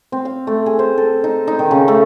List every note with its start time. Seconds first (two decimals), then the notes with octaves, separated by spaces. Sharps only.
0.12 C4
0.25 F5
0.47 A3
0.66 G#4
0.79 C5
0.98 A4
1.24 D#4
1.48 D#4
1.59 D#3
1.71 C#3
1.88 A3